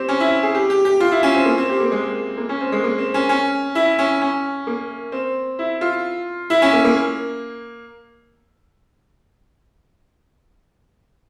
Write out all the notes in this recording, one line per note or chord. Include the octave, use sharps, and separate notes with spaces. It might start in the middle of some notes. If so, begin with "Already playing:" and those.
Already playing: C4 G4
C#4
E4
G#4
G4
G4
G4
F4
E4
C#4
C4
A#3
C4
G4
A#3
G#3
A#3
C#4
C4
G#3
A#3
C4
C#4
C#4
E4
C#4
C#4
A#3
C4
E4
F4
E4
C#4
A#3
A#3